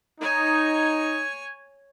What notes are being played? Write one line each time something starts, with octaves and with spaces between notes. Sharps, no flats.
D#4 C#5 G#5